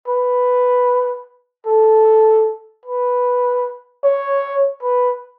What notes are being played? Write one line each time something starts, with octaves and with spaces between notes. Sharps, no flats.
B4
A4
B4
C#5
B4